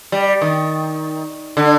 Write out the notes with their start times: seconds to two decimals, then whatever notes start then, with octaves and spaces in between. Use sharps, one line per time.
0.12 G3
0.41 D#3
1.57 D3